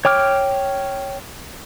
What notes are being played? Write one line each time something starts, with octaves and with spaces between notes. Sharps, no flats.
C#5 G5 D6 F6